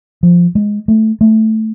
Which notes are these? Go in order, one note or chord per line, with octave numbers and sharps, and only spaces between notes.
F3
G#3
A3
A3